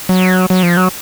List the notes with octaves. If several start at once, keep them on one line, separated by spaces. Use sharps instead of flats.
F#3
F#3
F3
F#3